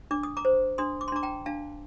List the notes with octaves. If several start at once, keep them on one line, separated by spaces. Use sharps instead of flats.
D4 D6
D#6
A#5 D6
C5
D4 C6 D#6
D6
C6
D4 A#5 D6
G5 A#5
D4 F5 A5